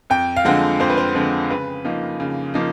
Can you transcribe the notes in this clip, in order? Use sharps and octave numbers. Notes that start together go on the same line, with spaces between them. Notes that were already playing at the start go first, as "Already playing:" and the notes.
F2 G5
F5
D3 F3 G#3 C4 F#5
F2 C5
B4
C5
D3 F3 G#3 C4
C#3 B4
F3 A#3 D#4
C#3
F3 A#3 D#4